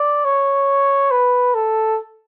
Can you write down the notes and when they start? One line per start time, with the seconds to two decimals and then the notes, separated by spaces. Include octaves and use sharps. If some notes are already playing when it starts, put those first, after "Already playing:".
Already playing: D5
0.25 C#5
1.11 B4
1.54 A4